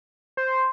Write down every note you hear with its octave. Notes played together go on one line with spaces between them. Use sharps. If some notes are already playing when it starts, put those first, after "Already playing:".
C5